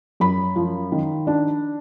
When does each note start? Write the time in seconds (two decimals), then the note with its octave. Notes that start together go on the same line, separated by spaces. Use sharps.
0.20 F#2 B5
0.56 F3
0.92 D#3
1.27 D4